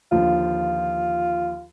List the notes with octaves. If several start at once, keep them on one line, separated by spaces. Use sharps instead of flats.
D#2 D3 F3 F4